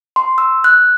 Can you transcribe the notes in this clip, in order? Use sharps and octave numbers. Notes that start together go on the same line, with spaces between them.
C6
E6
F#6